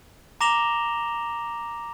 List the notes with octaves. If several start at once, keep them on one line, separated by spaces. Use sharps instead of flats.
A#5 D6 A#6 E7 F7 G7